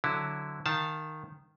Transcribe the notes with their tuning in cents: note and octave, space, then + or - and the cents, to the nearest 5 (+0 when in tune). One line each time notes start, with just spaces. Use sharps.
D3 +0 F#3 +0 E4 -10
D#3 -10 F5 +0 A5 +0